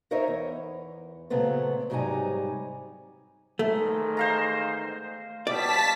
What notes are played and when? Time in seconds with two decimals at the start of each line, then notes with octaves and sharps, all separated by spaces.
0.11 D#4 A#4 C5 C#5 D#5 E5
0.28 E2
1.30 A#2 C#3 F#3 A3 B3 C4
1.90 G#2 C3 F#3 G3 D#4 G#5
3.59 E2 G#2 D#3 A3
4.17 C5 F5 A#5
5.47 B2 G3 D5 A5 B6